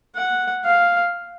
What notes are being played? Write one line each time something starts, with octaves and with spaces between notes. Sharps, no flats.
F#5
F5